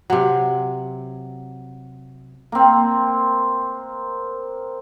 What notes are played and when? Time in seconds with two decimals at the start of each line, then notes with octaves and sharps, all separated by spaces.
0.10 C3 F#3
2.52 A#3 C4